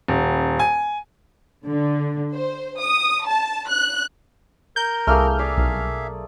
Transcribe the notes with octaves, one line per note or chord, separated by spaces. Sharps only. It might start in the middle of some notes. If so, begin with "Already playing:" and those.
D#1
G#5
D3
C5
D#6
A5
F#6
A#4 G6
C2 A3 A#3 G#4 F6
G#4 D5 E5 F5
B1